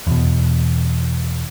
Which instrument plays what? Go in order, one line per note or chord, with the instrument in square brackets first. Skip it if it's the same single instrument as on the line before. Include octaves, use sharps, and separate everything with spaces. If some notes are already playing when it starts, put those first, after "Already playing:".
[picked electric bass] E2 B2